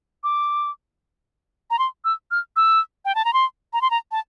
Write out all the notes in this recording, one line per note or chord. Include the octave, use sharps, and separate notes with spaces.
D6
A#5
C6
E6
F6
E6
G5
A5
A#5
C6
A#5
C6
A#5
A5